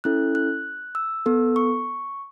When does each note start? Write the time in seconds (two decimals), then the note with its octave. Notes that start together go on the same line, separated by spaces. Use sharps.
0.04 C#4 E4 A4 F#6
0.35 F#6
0.95 E6
1.26 B3 A4
1.56 C#6